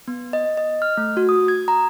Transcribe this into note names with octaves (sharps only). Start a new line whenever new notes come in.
B3
D#5
D#5
F6
A3
F#4
D#6
G#6
A#5